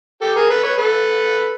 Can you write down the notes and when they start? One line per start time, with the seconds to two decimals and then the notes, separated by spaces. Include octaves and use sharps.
0.21 G4 A4
0.36 G#4 A#4
0.50 A4 B4
0.63 B4 C#5
0.78 A4 B4